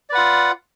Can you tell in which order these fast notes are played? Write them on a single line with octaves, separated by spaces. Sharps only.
D5 B4 F#5 F4